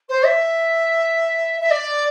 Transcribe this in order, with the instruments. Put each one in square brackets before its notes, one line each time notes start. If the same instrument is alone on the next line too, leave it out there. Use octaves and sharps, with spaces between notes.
[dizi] C5
E5
E5
D5